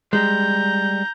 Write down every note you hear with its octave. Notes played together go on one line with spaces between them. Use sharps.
G3 G#3 A#5 G6